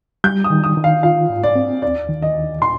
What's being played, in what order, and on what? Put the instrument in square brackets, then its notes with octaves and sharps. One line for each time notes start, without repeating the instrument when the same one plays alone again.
[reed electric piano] G3 [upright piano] G6
[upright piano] D#6
[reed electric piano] D#3
[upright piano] D#6
[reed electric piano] D#3
[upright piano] F5
[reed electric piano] F4 [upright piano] F5
[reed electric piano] G#2
[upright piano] D5
[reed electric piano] C4
[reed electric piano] D#2 [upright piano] D5
[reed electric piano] D#3
[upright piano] D#5
[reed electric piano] D#2
[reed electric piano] A#2 [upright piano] C6